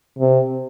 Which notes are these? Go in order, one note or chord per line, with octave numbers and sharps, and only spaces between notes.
C3